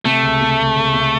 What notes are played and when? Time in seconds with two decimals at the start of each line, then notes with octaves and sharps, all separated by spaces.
0.05 C3 A3
0.23 C#2
0.41 C3
0.59 C#2
0.77 C#2
0.94 C3